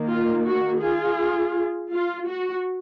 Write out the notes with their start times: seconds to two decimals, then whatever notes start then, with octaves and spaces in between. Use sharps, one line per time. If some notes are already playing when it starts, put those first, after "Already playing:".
Already playing: D#3 A#3
0.08 F4
0.45 F#4
0.81 F4 G#4
1.91 F4
2.27 F#4